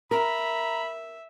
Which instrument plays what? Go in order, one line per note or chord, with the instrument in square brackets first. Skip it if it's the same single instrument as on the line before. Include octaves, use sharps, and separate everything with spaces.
[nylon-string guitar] A#4 [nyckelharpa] E5 [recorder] A#5 [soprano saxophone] B5